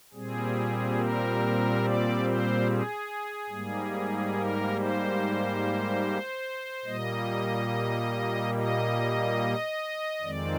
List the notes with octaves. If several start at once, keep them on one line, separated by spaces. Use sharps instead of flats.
A#2 G3 C4 G#4
A#4
D5
C5
G#4
G#2 G3 A#3
A#4
C5
A#2 G3 A#3 D#5
D#5
F2 D#3 G#3 C4 D5